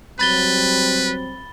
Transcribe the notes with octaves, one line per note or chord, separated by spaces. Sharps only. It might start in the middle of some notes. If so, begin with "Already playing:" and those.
F#3 G3 C4 B4 B5 A6 G7